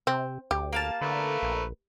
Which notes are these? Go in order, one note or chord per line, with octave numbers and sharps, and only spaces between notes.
C3 C4
D2 G4
A#3 F5 A5
D3 A3 A#4 B4
A#1